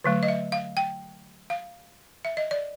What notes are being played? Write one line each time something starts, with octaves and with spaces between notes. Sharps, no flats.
D3 F#3 A3
D#5
E5
F5
G5
F5
E5
D#5
D5